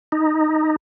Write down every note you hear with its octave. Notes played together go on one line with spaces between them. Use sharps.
D#4